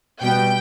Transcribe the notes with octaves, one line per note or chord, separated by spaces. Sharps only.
B2 G3 B3 G5